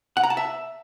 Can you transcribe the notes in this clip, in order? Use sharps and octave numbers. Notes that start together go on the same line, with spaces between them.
F#5
A#5
A5
E5